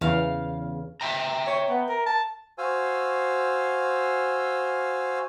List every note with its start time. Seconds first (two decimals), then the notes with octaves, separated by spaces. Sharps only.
0.01 E2 C#3 F5
1.01 E5 G5 A#5
1.47 C#5
1.69 B3
1.89 A#4
2.07 A5
2.58 F#4 C5 F5 G#5 E6